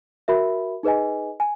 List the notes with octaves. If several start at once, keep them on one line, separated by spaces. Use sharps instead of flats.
F#4 A#4 E5 B5
D#4 G#4 B4 D#5 G#5
G#5